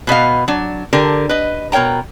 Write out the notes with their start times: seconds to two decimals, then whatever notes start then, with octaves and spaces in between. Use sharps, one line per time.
0.07 B2 B3 D#5 F5
0.48 F#3 D4
0.93 D3 G4 A#4
1.29 B4 D#5
1.72 B2 A#4 C#5 G5 A#5